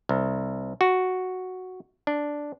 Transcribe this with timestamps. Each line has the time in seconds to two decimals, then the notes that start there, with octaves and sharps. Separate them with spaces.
0.09 C2
0.81 F#4
2.07 D4